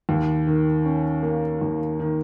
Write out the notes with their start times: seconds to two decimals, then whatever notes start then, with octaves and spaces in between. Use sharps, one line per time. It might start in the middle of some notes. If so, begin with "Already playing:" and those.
0.09 D#2
0.47 D#3
0.85 C#4
1.23 A#3
1.61 D#2
2.00 D#3